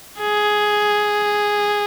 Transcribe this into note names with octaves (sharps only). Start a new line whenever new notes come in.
G#4